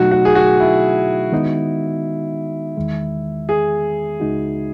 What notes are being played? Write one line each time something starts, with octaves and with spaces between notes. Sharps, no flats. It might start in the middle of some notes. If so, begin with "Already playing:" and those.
Already playing: B2 F#3 A3 D#4 F#4
F#4
G#4
F#4
E4
D#3 G#3 B3 D#4 F#4
E2 D#3 G#3
G#4
C#2 C#3 G#3 D#4 F#4